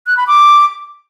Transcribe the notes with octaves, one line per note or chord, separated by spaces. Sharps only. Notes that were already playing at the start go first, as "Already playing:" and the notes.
F#6
B5
D6